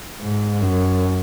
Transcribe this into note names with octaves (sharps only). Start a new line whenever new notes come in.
G#2
F#2